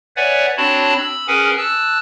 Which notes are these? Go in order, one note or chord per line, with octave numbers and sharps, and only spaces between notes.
B4 C#5 D5 E5 F#5 G#5
C4 D4 F#4 C#5 A5 B5
B5 E6
C#4 G#4 A#4 B4 F#5 G#5
A5 E6 F#6